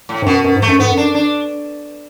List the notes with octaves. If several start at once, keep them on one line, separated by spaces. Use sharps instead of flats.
A2
G#2
F#2 B2
F#2 B2
G#2
A3
F#2
G#2 B3
F#2
D4
D4